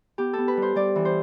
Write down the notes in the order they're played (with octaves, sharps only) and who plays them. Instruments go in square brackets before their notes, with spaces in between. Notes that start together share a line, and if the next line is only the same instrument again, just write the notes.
[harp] B3 G4
B3 A4
B4
G3
C5
G3 D5
E3
C5